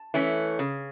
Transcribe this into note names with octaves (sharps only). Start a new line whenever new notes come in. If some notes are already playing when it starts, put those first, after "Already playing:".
Already playing: A5
E3 A3 C#4
C#3